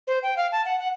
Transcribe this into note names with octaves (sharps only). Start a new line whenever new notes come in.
C5
G5
F5
A5
F#5
F#5